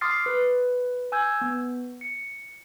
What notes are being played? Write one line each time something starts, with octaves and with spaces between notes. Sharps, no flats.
C6 D6 D#6 F6 A6 C7
B4
G#5 E6 G6 G#6
B3
C#7